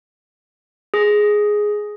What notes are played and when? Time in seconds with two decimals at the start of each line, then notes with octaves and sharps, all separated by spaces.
0.94 G#4